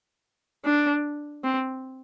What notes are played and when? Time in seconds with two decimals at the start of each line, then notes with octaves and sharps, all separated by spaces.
0.65 D4
1.44 C4